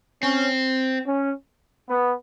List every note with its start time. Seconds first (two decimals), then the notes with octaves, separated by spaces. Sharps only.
0.22 C4 C#4
1.06 C#4
1.89 B3